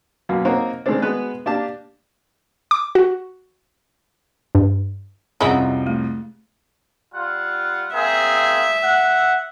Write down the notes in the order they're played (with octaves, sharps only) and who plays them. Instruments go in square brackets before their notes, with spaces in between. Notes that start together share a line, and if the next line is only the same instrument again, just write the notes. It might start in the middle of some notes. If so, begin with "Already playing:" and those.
[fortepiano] F#2 B2 A#3
A#3 C4 D#4 F#4 A#4 C#5
D#3 G#3 A3 C4 D4
G#3 B3 F#4 B4
A#3 D4 G4 A5
[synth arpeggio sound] D6
F#4
G2
[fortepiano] C2 F2 [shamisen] C#4 D#4 E4 [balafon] G#4 D#5 F#5
[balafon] A3
[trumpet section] G3 F4 F#5
[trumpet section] A#3 C4 G#4 [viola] E5
[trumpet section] F#5